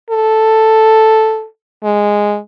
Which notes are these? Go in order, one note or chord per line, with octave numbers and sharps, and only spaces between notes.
A4
G#3